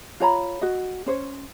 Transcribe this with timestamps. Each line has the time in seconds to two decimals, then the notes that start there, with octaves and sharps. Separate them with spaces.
0.20 F4 C#5 A#5 B5
0.61 F#4 D#5
1.06 C#4 C5 C#5